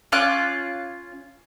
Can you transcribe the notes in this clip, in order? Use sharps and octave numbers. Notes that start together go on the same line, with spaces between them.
C#4 F4 D6 F#6